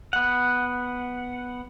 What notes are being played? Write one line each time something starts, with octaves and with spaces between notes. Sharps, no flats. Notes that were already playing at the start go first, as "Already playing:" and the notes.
B3 F#5